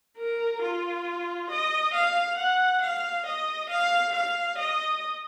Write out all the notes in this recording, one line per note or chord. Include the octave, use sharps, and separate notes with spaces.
A#4
F4
D#5
F5
F#5
F5
D#5
F5
F5
D#5